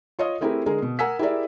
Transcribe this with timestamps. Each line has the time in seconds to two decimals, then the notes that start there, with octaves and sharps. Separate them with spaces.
0.19 F4 C#5 D#5 D#6
0.41 A3 C4 E4 G4 G#4 A#4
0.66 D3 G#3 G#4 A#4
0.82 B2
0.99 A#4 F#5 G#5 E6 B6
1.19 E4 G4 G#4 A#4 D5 E5